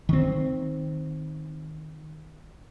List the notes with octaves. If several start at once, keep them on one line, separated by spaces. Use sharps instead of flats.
D#3 C4